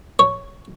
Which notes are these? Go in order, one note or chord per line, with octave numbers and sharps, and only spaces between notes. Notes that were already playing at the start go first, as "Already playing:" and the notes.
C#5